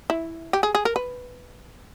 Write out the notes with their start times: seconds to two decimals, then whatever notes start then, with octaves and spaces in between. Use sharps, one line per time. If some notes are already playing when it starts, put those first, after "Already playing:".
0.10 E4
0.53 G4
0.63 G#4
0.75 G#4
0.85 A#4
0.96 B4